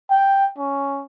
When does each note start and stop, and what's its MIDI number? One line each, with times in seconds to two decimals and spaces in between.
0.11 0.48 79
0.58 1.03 61